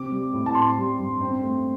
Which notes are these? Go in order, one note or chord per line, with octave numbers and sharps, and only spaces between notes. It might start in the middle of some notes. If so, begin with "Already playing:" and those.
Already playing: C3 C4 D6
G3
A2
A5
C4 C6
G3
G2
C4
A3